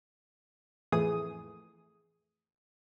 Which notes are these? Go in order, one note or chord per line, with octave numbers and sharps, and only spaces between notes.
F2 A2 E3 A3 G#4 D#6